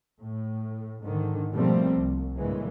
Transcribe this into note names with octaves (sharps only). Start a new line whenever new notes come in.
A2
G#2 D3 D#3
B2 F3 G3 A3 A#3 C4
C2
G2 A#2 C#3 E3 G#3